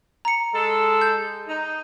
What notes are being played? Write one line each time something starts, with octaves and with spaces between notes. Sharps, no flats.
A#5 C#7
G#3 A4
G6
D#4